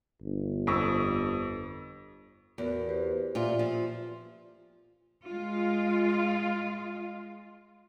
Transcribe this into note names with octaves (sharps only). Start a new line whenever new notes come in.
G1
F2 C#6 E6
E2 B3 F#4 A#4
G4 B4 C5
A#2 F4 D5 E5
F3
G#3 F4